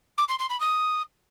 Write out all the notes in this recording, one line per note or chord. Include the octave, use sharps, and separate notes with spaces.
D6
C6
C6
B5
D#6